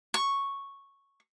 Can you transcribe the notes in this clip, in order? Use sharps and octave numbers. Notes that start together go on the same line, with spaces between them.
C#6